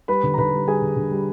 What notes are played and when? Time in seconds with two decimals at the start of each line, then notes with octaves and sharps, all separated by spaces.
0.08 G3 B4 B5
0.24 D3
0.34 A#5
0.38 D3 B4 B5
0.53 G3
0.67 G3 G#4 G#5
0.82 D3
0.97 D3
1.11 G3